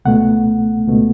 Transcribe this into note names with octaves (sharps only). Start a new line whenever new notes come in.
C#2 B2 A3 F#5
C#2 B2 A3